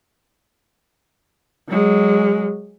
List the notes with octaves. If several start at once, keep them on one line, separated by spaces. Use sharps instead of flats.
F#3 G#3